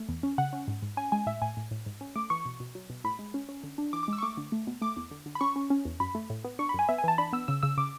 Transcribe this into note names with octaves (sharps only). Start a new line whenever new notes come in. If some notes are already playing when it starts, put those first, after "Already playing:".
Already playing: A3
E2
C#4
C#3 F#5
C#4
G#2
G#2
C#4 G#5
G#3 G#5
A2 E5
A2 G#5
A2
A2
G#2
C#4
A3 D6
E3 C#6
B2
B2
F#3
B2
A2 B5
G#3
C#4
C#4
D3
D4
E3 D6
D6
G#3 E6
C#6
A3 D6
D3
A3
B2
A3 D6
E2
D3
D3
B5
C#4 C#6
C#4
C#4
E2
F#2 B5
A3
A2
B3
D4 C#6
B5
F#2 G#5
B3 E5
G#5
E3 A5
D4 B5
B3 E6
C#3 E6
C#3 E6
C#3 D6